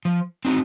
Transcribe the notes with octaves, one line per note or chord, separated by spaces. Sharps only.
F3
C4 D#4 F#4